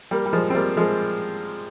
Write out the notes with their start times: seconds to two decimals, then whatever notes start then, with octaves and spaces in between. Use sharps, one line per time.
0.11 G3 A#3
0.26 G3
0.33 F3 G#3
0.50 C4
0.55 G3 A#3
0.77 F3 G#3